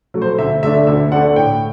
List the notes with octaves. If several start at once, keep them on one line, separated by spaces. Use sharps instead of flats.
F#3 A3
C5
D2 E5
D3 A3 D4 E5
D2 E5
D3 A3 D4 F#5
A2 G5